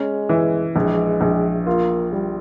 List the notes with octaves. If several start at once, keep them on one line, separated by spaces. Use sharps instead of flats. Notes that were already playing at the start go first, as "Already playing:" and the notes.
Already playing: G#3 C#4
E3
A#1 G#3
A#1
A#3 F4
G3